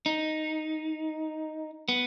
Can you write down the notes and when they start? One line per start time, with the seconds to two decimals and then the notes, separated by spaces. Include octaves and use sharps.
0.06 D#4
1.89 B3